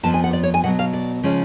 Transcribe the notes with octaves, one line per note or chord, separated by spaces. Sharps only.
F2 F3 B3 A5
G#5
F#5
D5
C#5
G#5
B2 F#3 B3 F#5
F5
D5
C#3 F3 G#3 C#4